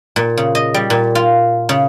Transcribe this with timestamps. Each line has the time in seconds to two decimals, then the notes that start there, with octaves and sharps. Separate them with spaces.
0.16 A#2
0.37 C#3
0.55 D#5
0.74 G3
0.90 A#2
1.15 F4
1.69 C#3